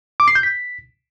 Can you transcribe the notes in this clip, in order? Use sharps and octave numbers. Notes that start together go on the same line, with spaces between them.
D6
C7
G6
B6